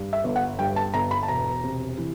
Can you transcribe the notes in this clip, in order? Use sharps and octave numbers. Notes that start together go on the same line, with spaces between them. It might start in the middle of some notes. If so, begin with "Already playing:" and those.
Already playing: G2
E5
G1
F#5
G2 G5
A5
G1 A#5
B5
A5
E1 A#5
C3
E3